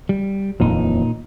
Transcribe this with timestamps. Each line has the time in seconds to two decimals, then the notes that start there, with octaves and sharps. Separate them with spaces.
0.09 G3
0.60 D#1 F2 A#2 E3 D#4